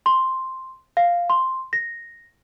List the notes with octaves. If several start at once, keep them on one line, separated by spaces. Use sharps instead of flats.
C6
F5
C6
A#6